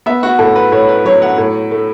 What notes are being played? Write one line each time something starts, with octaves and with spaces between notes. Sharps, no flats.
B3 E5
F#4
A2 A4
B4
A2 C#5
B4
F#3 C#5
F#5
A2
A3